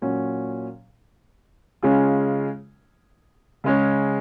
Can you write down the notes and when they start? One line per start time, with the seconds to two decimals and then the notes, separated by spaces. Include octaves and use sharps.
0.02 A#2 F#3 C#4
1.83 C#3 G#3 C#4 F4 G#4
3.64 C#3 G#3 C#4